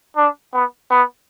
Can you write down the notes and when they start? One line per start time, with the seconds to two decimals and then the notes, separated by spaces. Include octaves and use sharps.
0.17 D4
0.53 B3
0.91 B3